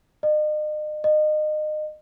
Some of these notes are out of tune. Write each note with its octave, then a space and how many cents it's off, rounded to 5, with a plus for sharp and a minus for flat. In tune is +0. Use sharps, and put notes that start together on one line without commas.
D#5 -40
D#5 -30